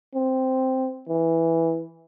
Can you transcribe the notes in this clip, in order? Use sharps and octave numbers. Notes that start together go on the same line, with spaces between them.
C4
E3